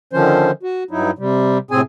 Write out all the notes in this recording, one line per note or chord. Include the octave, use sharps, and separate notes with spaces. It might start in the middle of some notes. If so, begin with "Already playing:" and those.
D3 D#3 F3 C#4 C5
F#4
G2 F#3 D#4 E4
C3 G3
A2 C3 C4 G#4 G#5